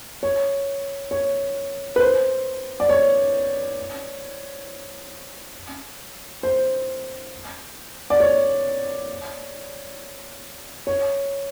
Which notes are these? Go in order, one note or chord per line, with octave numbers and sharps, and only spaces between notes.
C#5
C#5
B4
C5
D5
C#5
C5
D5
C#5
C#5